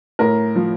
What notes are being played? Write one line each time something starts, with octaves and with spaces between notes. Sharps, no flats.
A2 A#4
F3